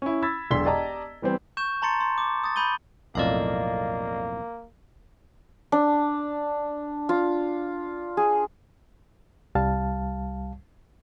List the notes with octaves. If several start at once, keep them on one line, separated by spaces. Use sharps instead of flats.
C#4 E4
B5 E6 G#6 A6 B6
E1 B1 D4 C6 B6 G7
G4 D5 D#5 A5 A#5
E3 G3 B3 C4
C#6 G6 E7
A5 A#5 C6 A6 C#7
C6
D6
D#6 A6
B5 G6 D#7 G7
B1 F2 A2 A#3 D5 D#5 F5
D4
F4
G#4
C2 G3 F5 A5